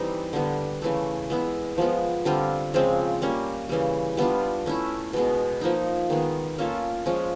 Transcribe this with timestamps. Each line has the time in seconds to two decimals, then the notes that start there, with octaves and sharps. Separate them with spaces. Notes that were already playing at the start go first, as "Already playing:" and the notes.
Already playing: E3 G3 C4 D#4
0.33 D3 G3 B3
0.82 C#3 E3 A3
1.30 G#3 B3 E4
1.78 F3 G#3 B3
2.25 D3 G3 C4 F4
2.74 C#3 F3 G#3 C4
3.22 G3 A#3 C#4
3.69 C#3 E3 G3
4.17 G3 B3 D4 F4
4.66 A3 C#4 E4
5.13 B2 G#3 B3
5.61 F3 A#3 D#4
6.10 D#3 G#3 B3
6.58 A#3 C#4 F4 A4
7.06 F3 G#3 C#4